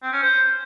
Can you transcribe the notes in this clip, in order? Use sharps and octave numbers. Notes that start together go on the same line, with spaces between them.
C4
C#4
C5